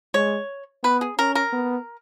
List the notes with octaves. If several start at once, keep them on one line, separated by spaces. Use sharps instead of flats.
G#3 C#5
B3 B4
G#4
C#4 A#4
A#4
B3